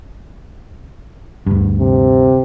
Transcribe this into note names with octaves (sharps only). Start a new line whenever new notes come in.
D2 G2
C3